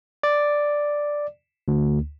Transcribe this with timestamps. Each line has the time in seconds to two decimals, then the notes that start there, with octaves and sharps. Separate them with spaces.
0.23 D5
1.68 D2